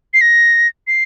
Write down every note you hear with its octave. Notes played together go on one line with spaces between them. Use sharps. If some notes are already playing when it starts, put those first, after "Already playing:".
C7
A#6
C7